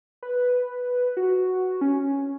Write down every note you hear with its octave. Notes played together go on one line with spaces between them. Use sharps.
B4
F#4
C#4